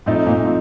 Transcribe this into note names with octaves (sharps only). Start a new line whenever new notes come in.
A2 F3 A3 C4 D#4
A#2
F3 C4